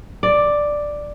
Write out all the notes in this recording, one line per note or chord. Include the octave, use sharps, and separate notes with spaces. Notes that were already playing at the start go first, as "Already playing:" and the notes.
D5